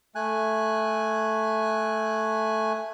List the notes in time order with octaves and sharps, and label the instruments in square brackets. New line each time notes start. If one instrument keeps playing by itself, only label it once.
[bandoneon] A3 G#5 F#6